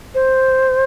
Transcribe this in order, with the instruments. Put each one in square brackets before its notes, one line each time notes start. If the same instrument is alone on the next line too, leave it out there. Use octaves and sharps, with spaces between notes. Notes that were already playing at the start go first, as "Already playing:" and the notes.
[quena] C5